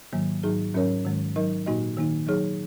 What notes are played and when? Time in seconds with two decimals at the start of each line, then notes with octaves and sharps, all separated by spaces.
0.13 G#2 D#3 F#3 A#3
0.43 G#2 F#3 D#4 G#4
0.74 G#2 F#3 C#4 A#4 C#5
1.05 G#2 D#3 G#3
1.36 F#3 D#4 A#4 D#5
1.66 A#2 A#3 D#4 F#4 D#5
1.97 D#3 A#3 D#4
2.27 F#3 D#4 G#4 C#5